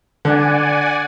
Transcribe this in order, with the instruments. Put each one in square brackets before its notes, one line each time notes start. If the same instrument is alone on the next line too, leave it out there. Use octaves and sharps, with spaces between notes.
[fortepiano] D3 [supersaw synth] D5 F#5 G#5